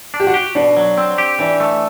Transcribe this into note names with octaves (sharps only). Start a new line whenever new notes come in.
D4
G4
F#4
G4
B2 D4
F#3
C4
G4
E3 D4
A3